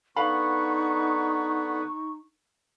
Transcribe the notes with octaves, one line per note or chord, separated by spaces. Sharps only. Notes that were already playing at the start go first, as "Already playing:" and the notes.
D3 B3 D#4 B4 F5 B5 C#6